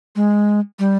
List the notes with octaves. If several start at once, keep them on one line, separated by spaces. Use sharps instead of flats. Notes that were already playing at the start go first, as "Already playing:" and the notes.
G#3
G3